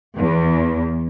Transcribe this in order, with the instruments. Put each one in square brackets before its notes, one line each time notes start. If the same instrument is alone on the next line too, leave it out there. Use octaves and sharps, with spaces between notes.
[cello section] E2